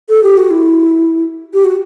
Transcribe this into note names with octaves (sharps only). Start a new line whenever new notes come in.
A4
G4
F#4
E4
G4
F#4